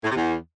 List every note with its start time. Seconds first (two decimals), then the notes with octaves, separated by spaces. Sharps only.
0.04 A2
0.10 C3
0.16 E2